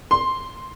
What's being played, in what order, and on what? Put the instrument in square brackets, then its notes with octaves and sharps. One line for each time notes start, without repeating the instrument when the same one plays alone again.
[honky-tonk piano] C6